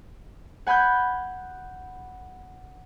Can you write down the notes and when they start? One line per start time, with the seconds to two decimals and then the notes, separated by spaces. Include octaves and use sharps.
0.67 F#5 G#5 B5 F#6 G6